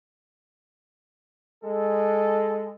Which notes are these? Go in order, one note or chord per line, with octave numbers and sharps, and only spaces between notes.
G#3 A4